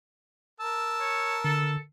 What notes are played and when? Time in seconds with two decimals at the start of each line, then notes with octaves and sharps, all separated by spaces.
0.61 A#4 A5 E6
1.00 C#5
1.44 D3 A4